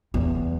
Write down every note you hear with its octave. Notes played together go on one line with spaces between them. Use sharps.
E2